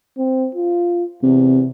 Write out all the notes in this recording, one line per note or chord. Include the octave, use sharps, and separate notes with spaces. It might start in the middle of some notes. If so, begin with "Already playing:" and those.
C4
F4
E2 C3